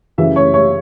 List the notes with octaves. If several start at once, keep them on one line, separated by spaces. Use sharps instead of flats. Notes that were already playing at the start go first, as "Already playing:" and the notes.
F#2 C#3 E3 E5
C#5
C#5